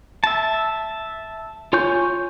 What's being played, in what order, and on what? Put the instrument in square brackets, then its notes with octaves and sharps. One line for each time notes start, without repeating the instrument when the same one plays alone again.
[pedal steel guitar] E5 A5
F4 C#5 G#5 C#6 G6